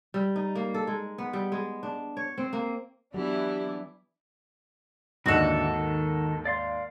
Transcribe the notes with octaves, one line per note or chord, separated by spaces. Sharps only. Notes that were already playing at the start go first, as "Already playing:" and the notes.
G3
D#4
A#3
A4
G#3
B3
G3
G#3
D4
C#5
C4
A#3
E3 F#3 B3 D4 E4 G4
D#2 G#2 D3 E3 D4 D#4 F#4 A4
D#3
D5 F5 C6